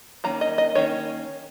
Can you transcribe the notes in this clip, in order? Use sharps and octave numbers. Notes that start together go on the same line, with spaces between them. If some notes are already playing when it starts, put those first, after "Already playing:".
D#3 A#3 C#4 A#5
D#5
D#5
D#3 A#3 C#4 C#5